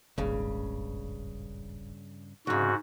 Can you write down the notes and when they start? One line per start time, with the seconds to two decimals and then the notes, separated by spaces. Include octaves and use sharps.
0.18 D#1 G#1 G2 C#3
2.47 C2 G#2 C#3 F#4